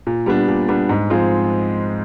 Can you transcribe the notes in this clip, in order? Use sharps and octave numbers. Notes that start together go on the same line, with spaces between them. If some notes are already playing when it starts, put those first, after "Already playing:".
A#2
G3 B3 D4
A#2
G3 B3 D4
G#2
F3 G#3 C4 F4